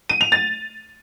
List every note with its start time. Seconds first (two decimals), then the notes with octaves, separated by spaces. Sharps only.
0.09 D#7
0.21 F7
0.32 A6